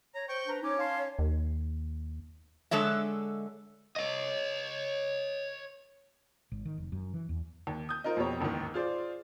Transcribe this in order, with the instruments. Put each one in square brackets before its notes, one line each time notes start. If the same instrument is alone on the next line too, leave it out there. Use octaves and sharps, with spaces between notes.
[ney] C#5 [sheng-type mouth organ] A#5
[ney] C5 [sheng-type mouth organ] G5 C#6 G6
[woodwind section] D4 B4 A#5
[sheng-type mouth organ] C#4 [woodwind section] D#4 D6 [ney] C#5
[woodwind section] F5 A5 C6
[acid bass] D#2
[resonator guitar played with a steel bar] D3 G#3 A4 C#5 E5
[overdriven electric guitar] C#5 D#5
[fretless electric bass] G#1
D#3
F1
F#2
E3
E2
[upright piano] D#2
D#6 G6
D#4 F4 A#4 C5
F2 B2 G4 C#5 A#5
A1 D#2 G#2 D#3
F4 G#4 C5 D5